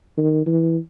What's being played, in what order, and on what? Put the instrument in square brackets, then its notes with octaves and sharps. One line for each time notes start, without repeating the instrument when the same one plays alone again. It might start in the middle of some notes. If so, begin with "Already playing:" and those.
[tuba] D#3
E3